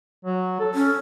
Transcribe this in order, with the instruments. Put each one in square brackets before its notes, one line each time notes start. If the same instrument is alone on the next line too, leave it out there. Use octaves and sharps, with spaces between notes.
[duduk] F#3
A4
[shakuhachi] C#4